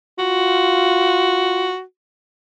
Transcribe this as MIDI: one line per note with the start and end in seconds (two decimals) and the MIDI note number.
0.19 1.74 65
0.19 1.82 66